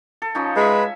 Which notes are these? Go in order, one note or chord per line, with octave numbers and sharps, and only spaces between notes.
A4
F3 C#4 D#4
G#3 B4 E5 G#5